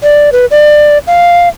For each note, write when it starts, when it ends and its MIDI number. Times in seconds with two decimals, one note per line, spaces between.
0.03 0.30 74
0.33 0.46 71
0.51 0.98 74
1.07 1.49 77